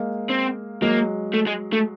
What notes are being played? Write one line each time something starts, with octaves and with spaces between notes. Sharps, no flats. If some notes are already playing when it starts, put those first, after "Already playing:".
Already playing: G#3 A#3
C4
F#3 G#3 A#3
A3
G#3
A3